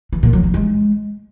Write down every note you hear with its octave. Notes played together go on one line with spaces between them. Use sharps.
E3
A#2
F#3
F3
G#3